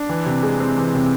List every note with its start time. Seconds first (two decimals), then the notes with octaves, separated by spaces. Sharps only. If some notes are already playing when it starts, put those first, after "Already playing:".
Already playing: D4
0.09 E3
0.26 C3
0.43 G#3
0.60 C4
0.78 E3
0.95 C3